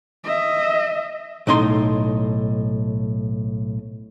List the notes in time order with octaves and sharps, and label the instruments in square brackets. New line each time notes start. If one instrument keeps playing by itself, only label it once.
[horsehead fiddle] D#5 E5
[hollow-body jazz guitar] B1 A2 D#4 A#5 C6